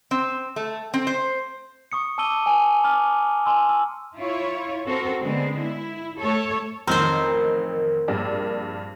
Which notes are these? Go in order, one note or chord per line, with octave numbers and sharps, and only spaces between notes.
C4
A3
C4
C5
C#6 D#6 C#7
A5 D6 E6 D#7 G7
G#5
A#5 D6 F6
G#5 C6 E6
E6
E4 F4 C#5
C4 F#4 A4 A#4
D3 G#3 B3 C4
E4
A3 A4 C#5
A1 F2 D#3 C4 A#4 C5
A#1 G2 D5